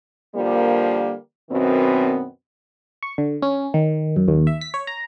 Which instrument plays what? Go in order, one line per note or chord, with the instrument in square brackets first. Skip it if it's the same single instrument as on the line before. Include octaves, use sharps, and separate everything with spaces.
[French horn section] D3 F3 G3 A#3
F#2 B2 D#3 B3 C4
[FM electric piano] C#6
D3
C#4
D#3
F#2
D#2
E5
B6
C#5
A#5